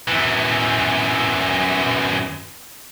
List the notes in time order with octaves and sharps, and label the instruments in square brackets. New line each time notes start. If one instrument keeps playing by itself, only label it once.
[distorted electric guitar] F#2 E3